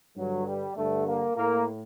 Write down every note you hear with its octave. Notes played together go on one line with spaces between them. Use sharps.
G2 D3 F#3
G3
G2 D3 A3
A#3
A2 A#3